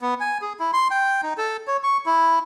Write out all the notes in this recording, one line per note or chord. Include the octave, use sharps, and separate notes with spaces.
B3
G#5
G#4
E4
C6
G5
D#4
A4
C#5
C#6
E4